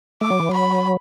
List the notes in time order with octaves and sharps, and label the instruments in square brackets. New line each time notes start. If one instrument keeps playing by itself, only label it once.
[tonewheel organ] A3 [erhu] D6
[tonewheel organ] F#3
E3
[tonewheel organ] F#3 [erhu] B5